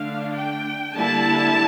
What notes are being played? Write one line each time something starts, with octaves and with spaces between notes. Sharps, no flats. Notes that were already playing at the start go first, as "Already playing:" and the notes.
Already playing: D3 A3 D4 F5
G5
D3 G3 A#3 E4 A5